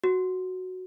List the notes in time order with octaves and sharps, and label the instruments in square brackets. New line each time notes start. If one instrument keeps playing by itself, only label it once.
[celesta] F#4